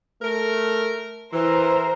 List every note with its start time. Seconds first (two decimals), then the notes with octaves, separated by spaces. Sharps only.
0.22 A3 A#4
1.33 E3 A#4 C5 A#5